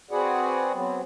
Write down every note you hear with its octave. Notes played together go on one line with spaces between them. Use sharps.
C4 F#4 G#4 B4 D5 F#5
F#3 B3 C4